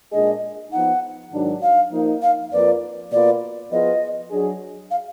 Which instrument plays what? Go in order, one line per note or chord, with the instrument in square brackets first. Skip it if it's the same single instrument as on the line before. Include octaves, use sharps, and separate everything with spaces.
[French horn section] A#2 G#3 D4 G#4 [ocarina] D#5
[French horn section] F3 B3 D#4 [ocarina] F#5
[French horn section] G#2 D#3 F#3 D4
[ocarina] F5
[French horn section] F3 A#3 D#4
[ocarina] F5
[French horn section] F2 F3 A#3 F4 B4 [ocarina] D5
[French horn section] B2 A#3 F4 B4 [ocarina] D5
[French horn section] F3 B3 F4 G#4 B4 [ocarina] D#5
[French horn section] F#3 D4 G#4
[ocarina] F5